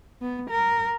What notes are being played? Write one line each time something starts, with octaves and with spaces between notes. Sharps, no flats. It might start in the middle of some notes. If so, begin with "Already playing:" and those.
B3
A#4